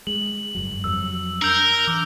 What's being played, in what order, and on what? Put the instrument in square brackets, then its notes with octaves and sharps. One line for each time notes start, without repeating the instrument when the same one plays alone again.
[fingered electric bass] G#3 [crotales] F#7
[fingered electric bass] F#1 G2 F#3
[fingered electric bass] F2 F#3 G3 [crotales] E6
[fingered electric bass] D4 [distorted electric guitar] A#4 [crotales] E6 G6 G7
[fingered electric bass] E3 [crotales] D6